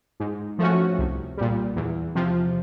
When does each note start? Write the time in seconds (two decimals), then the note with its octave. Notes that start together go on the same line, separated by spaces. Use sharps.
0.20 G#2
0.59 F3 A3 C#4 F#4
0.99 C2
1.37 A#2 G3
1.76 E2
2.15 C3 F3